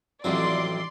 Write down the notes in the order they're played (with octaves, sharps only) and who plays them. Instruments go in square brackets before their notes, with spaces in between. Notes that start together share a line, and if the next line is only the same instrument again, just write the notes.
[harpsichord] A1 F2 C4 [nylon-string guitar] F#3 E4 C5 [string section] D5 C6